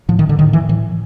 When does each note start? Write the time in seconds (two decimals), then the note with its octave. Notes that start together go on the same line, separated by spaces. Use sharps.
0.09 A2 F3
0.19 D#3
0.29 D3
0.39 A2 D#3
0.53 E3
0.69 A2 E3